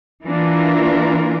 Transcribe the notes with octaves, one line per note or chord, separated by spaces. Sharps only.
E3 A#3 D4 F4 A#4